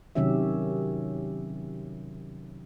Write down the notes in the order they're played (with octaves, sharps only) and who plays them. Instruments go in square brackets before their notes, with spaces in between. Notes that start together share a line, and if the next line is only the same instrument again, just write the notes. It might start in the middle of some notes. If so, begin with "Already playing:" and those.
[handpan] C3 D#3 F#3 C#4 G4 E5